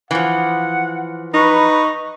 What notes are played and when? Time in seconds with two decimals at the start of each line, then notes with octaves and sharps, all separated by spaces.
0.11 E3 F3 F#5
1.34 D#4 B4 A#5 B5 C#6